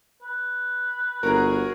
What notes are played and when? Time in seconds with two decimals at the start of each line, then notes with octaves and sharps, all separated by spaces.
0.22 B4
1.23 G1 F#4 G#4 A#4 A#5